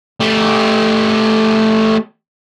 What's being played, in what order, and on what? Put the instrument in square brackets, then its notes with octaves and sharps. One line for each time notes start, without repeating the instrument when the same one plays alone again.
[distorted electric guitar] A3 G4